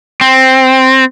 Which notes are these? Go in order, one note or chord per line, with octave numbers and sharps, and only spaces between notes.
C4